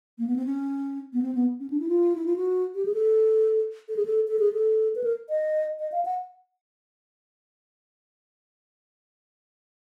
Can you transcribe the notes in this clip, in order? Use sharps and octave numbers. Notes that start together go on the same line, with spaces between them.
A#3
B3
C4
C#4
B3
C4
B3
C#4
D4
E4
F4
E4
F4
F#4
G4
G#4
A4
A4
G#4
A4
A4
G#4
A4
B4
A#4
D#5
D#5
F5
F#5